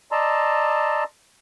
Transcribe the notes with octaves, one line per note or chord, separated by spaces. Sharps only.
D5 D#5 A5 A#5 C6 E6